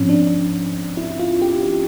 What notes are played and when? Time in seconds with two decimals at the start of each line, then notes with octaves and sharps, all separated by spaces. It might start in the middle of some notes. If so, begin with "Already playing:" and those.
Already playing: G#2 F3 C4 C#4
0.09 D4
0.97 E4
1.19 F4
1.42 G4
1.63 G4